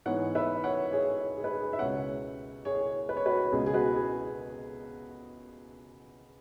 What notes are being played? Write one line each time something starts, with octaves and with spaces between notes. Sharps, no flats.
G#2 E3 B3 C#5 F#5
B4 E5
C#5 F#5
G#4 C#5
G#4
B4
G#4
E5
C#2 B2 G#3 B3 C#5 F#5
G#4 C#5
B4
C#5
F#4 B4
C#2 B2 G#3 B3 G#4
G#4
F#4 B4
G#4